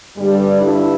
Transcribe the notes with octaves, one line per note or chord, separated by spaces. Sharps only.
G2 D3 G3
E4